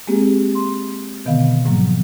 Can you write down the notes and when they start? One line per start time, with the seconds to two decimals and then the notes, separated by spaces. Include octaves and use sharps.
0.07 G#3 A#3 C4 G4 G#4
0.55 C6
1.25 B2 D3 D#3 B3 D#5 F5
1.65 G#2 F3 F#3 A#3